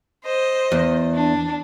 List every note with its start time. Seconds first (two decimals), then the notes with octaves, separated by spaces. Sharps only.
0.24 C5 D#5
0.72 E2
1.14 D4